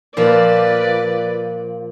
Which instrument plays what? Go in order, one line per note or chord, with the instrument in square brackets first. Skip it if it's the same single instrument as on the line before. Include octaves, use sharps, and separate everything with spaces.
[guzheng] A#2 F3 [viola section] B4 D5